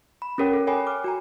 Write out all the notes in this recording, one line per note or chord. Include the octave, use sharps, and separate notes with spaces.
B5
C#4 G4 A#4 C#5 G5
A4
A4 C#5 G5 G#5 B5
D6 F6
F#4 G#5 A#5